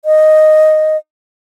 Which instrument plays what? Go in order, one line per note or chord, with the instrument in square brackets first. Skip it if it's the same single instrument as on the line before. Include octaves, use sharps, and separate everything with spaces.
[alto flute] D#5